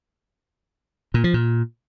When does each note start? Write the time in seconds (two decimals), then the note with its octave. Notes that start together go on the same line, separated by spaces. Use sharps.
1.14 A#2
1.24 F3
1.34 A#2